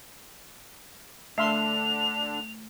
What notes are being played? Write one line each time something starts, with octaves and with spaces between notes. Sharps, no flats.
D3 A3 D4 E5 F5 C6 F7